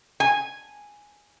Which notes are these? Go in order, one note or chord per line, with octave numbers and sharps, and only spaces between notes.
G#5